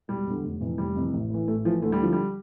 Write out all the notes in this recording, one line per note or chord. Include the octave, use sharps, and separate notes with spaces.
E1 G3
E2 D3
F1
F2 C3 E3
F1 G3
F2 C3 E3
A1
A2 E3
A1 A3
A2 E3 F3
D2 A3
G3
D3 F3
G3